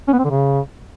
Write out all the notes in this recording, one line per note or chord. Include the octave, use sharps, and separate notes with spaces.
C#4
B3
C4
D3
C#3